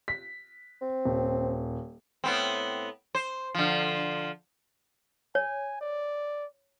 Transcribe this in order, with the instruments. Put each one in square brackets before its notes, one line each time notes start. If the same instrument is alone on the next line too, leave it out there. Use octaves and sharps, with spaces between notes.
[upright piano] B6
[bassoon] C4
[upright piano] D#1
[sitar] A2 B3 C4
C5
D3 F3
[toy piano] C#5 [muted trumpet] G#5
[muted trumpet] D5